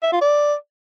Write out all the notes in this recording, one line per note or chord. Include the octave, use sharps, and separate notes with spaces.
E5
F4
D5